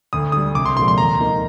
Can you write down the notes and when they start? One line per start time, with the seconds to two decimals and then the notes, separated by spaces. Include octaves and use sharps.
0.13 D2 D#6
0.32 D3 G3 D#6
0.55 C2 D6
0.66 C6
0.77 A#2 F3 G#3 C6
0.88 C6
0.98 D#2 A#5
1.20 D#3 A#3 D#4